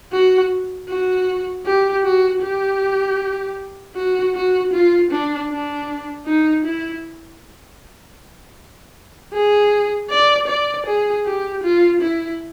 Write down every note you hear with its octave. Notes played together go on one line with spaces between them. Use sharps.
F#4
F#4
G4
F#4
G4
F#4
F#4
F4
D4
D4
D#4
E4
G#4
D5
D5
G#4
G4
F4
E4